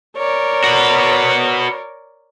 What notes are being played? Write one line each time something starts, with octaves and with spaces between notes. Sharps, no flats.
A#4 C#5 D5
F#4 B4